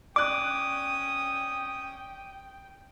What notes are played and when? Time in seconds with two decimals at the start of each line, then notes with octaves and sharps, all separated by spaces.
0.16 C#4 D5 G5 D6 D#6 F#6